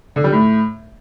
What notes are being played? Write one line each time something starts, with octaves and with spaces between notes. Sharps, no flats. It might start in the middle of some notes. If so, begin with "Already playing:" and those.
D3
G3
A2